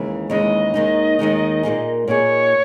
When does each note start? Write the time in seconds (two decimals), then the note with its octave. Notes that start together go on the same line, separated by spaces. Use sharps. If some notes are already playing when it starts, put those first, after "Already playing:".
Already playing: D#2 C#3 E3 G#3
0.29 D#2 C#3 E3 G#3 D#5
0.74 D#2 D#3 G#3 D#4
1.19 D#2 D#3 G#3 D#4
1.63 A#2 A#3 D#4 G#4
2.08 A#2 A#3 D#4 G#4 C#5